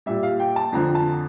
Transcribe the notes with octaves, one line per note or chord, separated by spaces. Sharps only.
A#2 G3 E5
F5
G5
A5
F2 D3 F3 A#5
A5